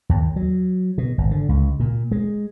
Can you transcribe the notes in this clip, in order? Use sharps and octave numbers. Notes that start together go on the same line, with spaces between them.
D#2
F#3
B2
G#1
D3
C#2
A#2
G#3